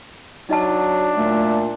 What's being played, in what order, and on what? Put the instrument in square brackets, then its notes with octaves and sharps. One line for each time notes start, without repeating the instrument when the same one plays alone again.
[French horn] F#3 [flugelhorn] D4 [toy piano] D#4 D#5 A5
[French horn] A#2 [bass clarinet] A3